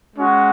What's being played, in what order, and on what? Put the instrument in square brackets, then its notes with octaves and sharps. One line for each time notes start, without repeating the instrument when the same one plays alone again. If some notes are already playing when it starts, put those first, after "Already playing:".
[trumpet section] G#3 C#4 F#4